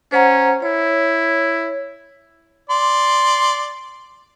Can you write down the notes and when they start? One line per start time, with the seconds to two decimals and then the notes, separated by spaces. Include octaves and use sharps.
0.12 C#4 C5 F#5 A#5
0.62 E4 C#5
2.70 D5 C6